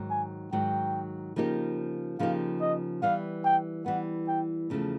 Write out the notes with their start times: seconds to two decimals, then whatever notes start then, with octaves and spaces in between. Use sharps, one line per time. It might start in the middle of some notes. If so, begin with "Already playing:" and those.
Already playing: G#2 D#3 F#3
0.10 G#5
0.52 G#2 D#3 F#3 G5
1.36 C#3 F3 A#3 D#4 G4
2.19 C#3 F3 A#3 D#4 G4 F5
2.61 D#5
3.02 E3 G3 B3 F5
3.44 G5
3.86 E3 G3 B3 F#5
4.28 G5
4.70 E2 C#3 F3 A3